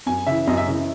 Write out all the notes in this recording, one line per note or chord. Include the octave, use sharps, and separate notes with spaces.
F#2 G#5
C#3 E3 E5
F#2 D#5
E5
C#3 E3